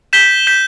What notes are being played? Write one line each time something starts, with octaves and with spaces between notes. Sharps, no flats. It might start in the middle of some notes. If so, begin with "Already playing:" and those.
G6 B6 E7 G7
G6 B6 E7 G7